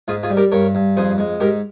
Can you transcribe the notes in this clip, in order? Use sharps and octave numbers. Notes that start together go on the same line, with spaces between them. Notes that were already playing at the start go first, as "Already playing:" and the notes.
G#2 F4 G#4
F4 G#4
G3
G4 A#4
G2 A#4 C#5
G2
F2 G#4 C5
G#3
G#2 G4 A#4